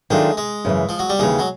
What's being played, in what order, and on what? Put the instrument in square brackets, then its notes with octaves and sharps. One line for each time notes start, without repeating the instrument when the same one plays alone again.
[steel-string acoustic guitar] D#3 F#3 A3 D4 F4 [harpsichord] G#3
[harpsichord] G#3
[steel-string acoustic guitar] F#2 C#3 E3
[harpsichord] F3
F#3
G3
[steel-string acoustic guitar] D#2 C#3 E3 [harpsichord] G#3
[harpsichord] F#3